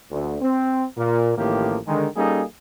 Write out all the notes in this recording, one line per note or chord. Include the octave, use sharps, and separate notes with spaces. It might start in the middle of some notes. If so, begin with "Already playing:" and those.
D2
C4
A#2 A#3
A1 A2 D#3 F3 A#3 G4
D3 D#3 G#3
G3 A#3 C#4 D#4 G#4 A4